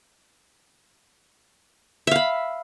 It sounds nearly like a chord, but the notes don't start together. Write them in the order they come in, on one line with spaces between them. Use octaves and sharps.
E5 F5 B5